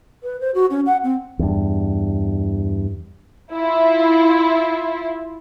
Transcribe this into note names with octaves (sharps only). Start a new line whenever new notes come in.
B4
C5
F#4
C#4
F#5
C4
E2 G2
E4 F4